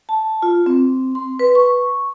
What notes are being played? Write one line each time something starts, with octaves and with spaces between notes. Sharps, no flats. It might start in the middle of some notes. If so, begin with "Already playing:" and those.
A5
F4
C4
C6
B4
C#6